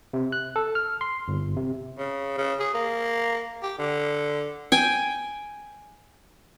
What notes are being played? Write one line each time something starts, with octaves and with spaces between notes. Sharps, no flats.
C3
F#6
A4
F6
C6
G1
C3
C#3
C#3
G#4
A#3
G4
D3
G5 G#5